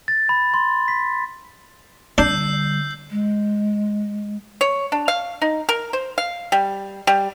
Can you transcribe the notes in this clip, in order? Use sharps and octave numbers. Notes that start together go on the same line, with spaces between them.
A6
B5
C6
B6
D3 G3 D4 E6 G6 C7
G#3
C#5
D4
F5
D#4
A#4
C5
F5
G3
G3